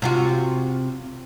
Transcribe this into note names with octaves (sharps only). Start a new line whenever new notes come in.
C3 F4 F#4